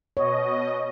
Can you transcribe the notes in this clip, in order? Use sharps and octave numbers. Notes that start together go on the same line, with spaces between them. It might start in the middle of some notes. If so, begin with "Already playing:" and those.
B2 C#5 D#5